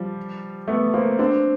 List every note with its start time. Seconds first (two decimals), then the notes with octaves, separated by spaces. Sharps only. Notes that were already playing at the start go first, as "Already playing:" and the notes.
Already playing: F3 G3
0.68 A3 B3
0.94 A#3 C4
1.19 C4 D4